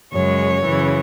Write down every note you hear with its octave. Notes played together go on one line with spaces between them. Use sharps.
F#2 C#3 G#3 C#5
F#2 C#3 E3